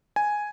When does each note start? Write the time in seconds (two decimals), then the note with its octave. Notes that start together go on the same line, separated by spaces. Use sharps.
0.16 G#5